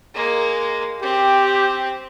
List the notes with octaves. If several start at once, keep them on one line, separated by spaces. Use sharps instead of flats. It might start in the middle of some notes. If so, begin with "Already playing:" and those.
G#3 A#3
C4 G4